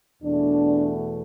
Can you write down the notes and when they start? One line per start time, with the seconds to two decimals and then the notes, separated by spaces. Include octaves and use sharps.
0.23 E2 B2 A3 D4